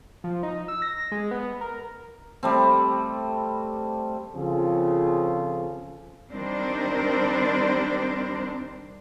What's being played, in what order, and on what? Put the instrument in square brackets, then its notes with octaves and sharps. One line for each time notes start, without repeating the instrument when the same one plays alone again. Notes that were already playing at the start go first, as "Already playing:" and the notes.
[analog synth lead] F3
D#4
E6
A#6
G#3
B3
A#4
[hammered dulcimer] G3 A3 C4
[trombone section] C#3 F3 C4 F4 G#4 A4
[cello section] D#3 G3 C4 D4 A#4 C5